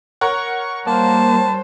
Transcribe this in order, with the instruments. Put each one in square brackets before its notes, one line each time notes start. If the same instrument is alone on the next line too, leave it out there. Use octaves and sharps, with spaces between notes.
[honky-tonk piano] A#4 C#5 F#5 [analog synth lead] C#6
[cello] G3 C5 [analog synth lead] A#3 [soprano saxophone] A5